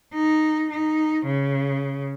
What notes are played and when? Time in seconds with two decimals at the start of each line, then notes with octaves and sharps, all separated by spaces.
0.14 D#4
0.70 D#4
1.26 C#3